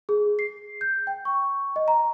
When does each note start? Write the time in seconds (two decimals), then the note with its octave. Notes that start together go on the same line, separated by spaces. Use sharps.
0.09 G#4
0.39 C7
0.81 G6
1.07 G5
1.25 C#6
1.76 D#5
1.88 A#5